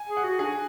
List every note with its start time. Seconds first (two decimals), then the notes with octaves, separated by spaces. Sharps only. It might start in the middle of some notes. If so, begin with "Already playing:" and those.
Already playing: G#5
0.09 G#4
0.17 F#5
0.24 F#4
0.39 D4 G#4